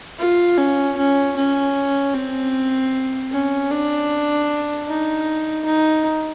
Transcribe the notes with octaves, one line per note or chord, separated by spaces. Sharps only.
F4
C#4
C#4
C#4
C4
C#4
D4
D#4
D#4